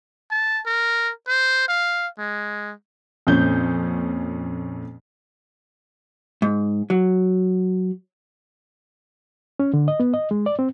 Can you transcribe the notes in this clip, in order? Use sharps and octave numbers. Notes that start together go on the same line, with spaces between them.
A5
A#4
C5
F5
G#3
F2 A#2 C#4 G6
G#2
F#3
C#4
D3
D#5
B3
D#5
G#3
D5
C4